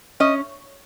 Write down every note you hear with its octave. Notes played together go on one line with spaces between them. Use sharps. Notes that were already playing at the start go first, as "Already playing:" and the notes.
C#4 D#5